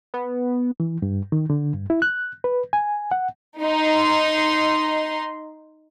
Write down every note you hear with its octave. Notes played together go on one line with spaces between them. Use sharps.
B3
E3
G2
D#3
D3
G2
E4
F#6
B4
G#5
F#5
D#4 C6